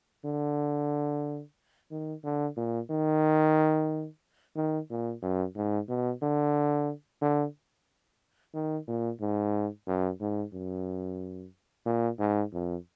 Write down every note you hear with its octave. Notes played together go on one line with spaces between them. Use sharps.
D3
D#3
D3
A#2
D#3
D#3
A#2
F#2
G#2
B2
D3
D3
D#3
A#2
G#2
F#2
G#2
F#2
A#2
G#2
F2